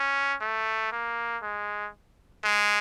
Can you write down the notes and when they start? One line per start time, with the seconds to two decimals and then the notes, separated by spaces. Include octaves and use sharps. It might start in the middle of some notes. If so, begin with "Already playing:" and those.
Already playing: C#4
0.41 A3
0.92 A#3
1.43 G#3
2.44 G#3